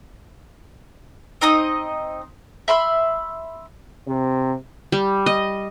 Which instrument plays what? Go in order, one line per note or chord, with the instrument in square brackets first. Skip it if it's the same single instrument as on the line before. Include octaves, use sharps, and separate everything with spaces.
[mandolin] C4 D#4 D#5 D#6
E5 B5 C6 E6
[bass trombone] C3
[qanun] G3
D#5